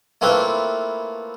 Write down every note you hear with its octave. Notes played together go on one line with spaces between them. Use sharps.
A3 A#3 C4 E4 F4 B4